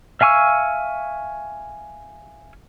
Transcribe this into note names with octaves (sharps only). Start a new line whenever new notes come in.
E5 F5 G#5 C#6 E6